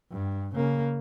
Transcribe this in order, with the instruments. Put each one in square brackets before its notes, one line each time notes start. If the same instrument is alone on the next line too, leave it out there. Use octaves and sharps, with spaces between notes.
[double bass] G2
C#3 A#3